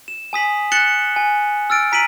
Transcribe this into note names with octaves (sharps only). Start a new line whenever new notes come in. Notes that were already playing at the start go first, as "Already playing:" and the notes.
E7
G#5 D#6 B6 F#7
F#6 A6 C#7 E7 F#7 G7
G#5
E6 F6 A6 D7
A#5 B6 D7 D#7 F#7